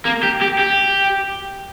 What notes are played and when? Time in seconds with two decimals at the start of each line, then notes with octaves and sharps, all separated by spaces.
0.05 A#3
0.23 G4
0.42 G4
0.59 G4